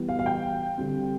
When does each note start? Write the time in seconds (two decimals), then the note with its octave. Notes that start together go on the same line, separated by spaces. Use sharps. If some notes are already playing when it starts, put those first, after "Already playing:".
Already playing: E3 G3 B3
0.09 F5
0.19 F5
0.26 G5
0.78 D3 G3 C4